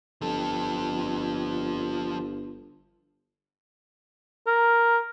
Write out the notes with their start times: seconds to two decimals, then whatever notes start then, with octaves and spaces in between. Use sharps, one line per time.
0.21 G1 F3 A4
4.47 A#4